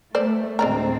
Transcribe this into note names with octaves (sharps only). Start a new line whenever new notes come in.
A3 C5 D5
D2 A2 G#3 C4 D5 A#5